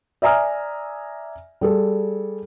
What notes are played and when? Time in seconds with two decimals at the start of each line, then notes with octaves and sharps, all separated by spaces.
0.22 D5 E5 G#5 A#5 D#6 F6
1.61 G3 G#4 A4